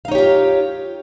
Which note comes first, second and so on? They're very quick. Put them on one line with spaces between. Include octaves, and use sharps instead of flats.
F5 D#4 C#5 G4 F4